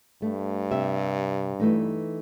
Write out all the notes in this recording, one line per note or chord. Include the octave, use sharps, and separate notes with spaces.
G2 A3
C3 G4 E5
E3 A3 D#4